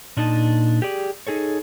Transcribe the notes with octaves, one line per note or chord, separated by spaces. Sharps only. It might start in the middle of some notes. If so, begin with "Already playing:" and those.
A#2 D4 D#4 D#5 A5
G4 G#4 D5
D#4 G#4 A4 C#5